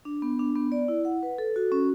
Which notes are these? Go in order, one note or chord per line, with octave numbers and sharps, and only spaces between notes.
D4
B3
D4
B3
D5
E4
F#5
B4
A4
F#4
C#4